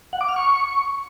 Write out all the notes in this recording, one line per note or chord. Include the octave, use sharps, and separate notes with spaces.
F#5
D6
F6
C#6